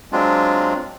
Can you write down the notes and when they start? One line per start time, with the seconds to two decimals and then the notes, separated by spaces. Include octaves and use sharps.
0.12 F#3 G#3 C4 D4 F4